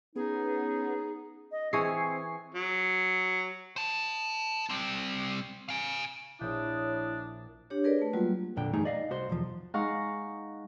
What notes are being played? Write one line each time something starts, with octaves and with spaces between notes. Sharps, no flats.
B3 C#4 D#4 G#4
D#5
E3 C4 G#4 G#5 C#6 C7
F#3
C5 A5
G3 C4
F5 G#5
A#1 D4 E4 C#5 D#6 G6 D7
D4 G4 C#5
G#4 A#4 B4 D5
A3 B4
F#3 G3 A#3 F4 F#4
F2 A#2 D3 G5
E2 G2 A3 D#4 G#4
D5 D#5 F5
C2 F#4 C5 C6
B1 E2 F3
G#3 D#4 F5 F#5 A#5 C#6